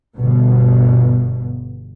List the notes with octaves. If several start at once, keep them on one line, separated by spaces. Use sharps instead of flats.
G1 B2